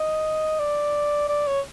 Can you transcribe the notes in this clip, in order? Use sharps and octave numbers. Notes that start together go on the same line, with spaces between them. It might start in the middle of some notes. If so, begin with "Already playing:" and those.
Already playing: D#5
D5
D5
C#5